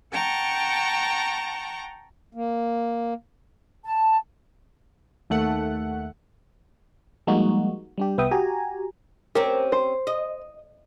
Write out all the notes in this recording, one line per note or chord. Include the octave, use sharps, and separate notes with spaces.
F#5 G5 A5 A#5 C#6
A#3
A5
D#2 A3 F#5
F3 G3 G#3 A#3 D#4 F#4
G3 D4 G4
C2 B3 B4 E5 G5 D#6
F#4 G4 G#5 A#5
C4 C#4 G4 A#4
C5
D#5